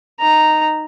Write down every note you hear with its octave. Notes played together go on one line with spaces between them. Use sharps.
D#4 A#5